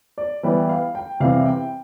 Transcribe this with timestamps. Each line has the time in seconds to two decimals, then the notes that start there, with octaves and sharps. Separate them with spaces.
0.18 D5
0.43 E3 G3 B3
0.69 F5
0.95 G5
1.20 C3 E3 G3 C4 F5
1.46 G5